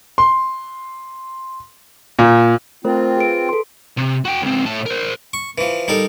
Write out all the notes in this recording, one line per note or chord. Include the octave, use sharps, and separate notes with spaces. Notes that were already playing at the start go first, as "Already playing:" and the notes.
C6
A#2
A3 C4 F4 A#4 C5
G#4 B4 D7
A4 C6
C3
F#4 G5
C#2 C4
A2 A5
A#4 C5
C#6
E3 F3
G3 D#4 A4 A#4